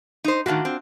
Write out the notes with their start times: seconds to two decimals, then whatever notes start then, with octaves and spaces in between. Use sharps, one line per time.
0.24 D#4 C5
0.46 A2 D#3 D4 F4 F#4
0.65 C4